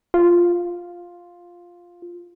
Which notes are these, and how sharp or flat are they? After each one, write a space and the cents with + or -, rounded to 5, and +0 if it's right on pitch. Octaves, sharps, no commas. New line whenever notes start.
F4 +5